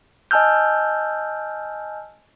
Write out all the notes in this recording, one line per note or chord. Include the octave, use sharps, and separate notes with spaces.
D#5 G#5 A5 E6 F6 G6